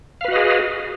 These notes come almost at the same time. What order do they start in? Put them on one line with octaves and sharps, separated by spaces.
F5 B4 F#4 D#5 G#4